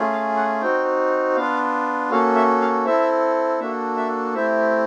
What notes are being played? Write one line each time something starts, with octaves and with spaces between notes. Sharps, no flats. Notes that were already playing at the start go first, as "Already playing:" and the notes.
Already playing: A3 C#4 F4 G#4
F5
F#5
C4 D#4 F#4 G5
B3 D4 F4 F5
A#3 C#4 F#4 A4 F5
E5
F5
C4 E4 A4 E5
A#3 D4 F#4 A4 E5
E5
A3 C4 E4 G4 E5